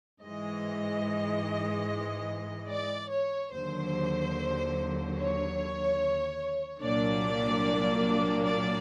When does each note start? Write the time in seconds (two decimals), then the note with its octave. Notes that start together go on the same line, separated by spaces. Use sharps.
0.23 G#2 E3 G#3 D#5
2.70 D5
3.11 C#5
3.52 D#2 D3 F#3 C5
5.16 C#5
6.80 C2 A#2 F#3 A#3 D4 D5
8.45 D5